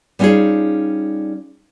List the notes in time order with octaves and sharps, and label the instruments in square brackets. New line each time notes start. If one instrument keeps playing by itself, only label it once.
[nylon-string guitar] G3 B3 C#4 D#4 F4 G#4